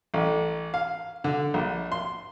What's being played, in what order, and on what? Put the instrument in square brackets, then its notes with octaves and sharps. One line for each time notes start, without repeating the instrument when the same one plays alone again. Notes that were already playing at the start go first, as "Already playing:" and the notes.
[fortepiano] A1
F5
D3
A#1
C6